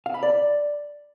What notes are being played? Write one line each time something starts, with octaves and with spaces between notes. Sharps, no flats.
F5
B5
D5